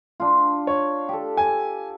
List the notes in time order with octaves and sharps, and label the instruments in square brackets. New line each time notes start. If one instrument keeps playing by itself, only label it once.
[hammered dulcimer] D4 F4
[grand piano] C#5
[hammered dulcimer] G4 A4
[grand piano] G#5